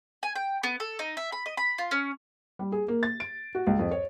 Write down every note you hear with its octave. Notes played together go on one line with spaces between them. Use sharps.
G#5
G5
B3
A4
D#4
E5
B5
D#5
B5
F4
C#4
G3
G#4
A#3
A6
D7
F#4
C#2
F2
C#5